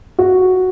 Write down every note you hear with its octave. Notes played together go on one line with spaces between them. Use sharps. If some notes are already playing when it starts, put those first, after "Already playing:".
F#4